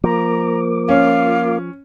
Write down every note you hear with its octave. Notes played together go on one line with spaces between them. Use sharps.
F3 A#3 A#4 A#5 D6
C#4 F4 F5